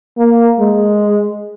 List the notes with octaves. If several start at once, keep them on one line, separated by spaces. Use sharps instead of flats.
A#3
G#3